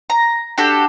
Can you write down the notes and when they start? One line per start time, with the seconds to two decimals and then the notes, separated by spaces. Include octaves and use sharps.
0.10 A#5
0.58 D4 F#4 G4 A4